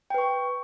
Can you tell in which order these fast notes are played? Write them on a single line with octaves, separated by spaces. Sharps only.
G5 B4 C#6